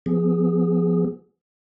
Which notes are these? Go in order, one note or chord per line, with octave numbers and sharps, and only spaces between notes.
F3 B3 G#4